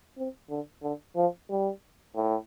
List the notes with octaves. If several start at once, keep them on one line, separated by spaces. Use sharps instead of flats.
C4
D3
D3
F3
G3
A2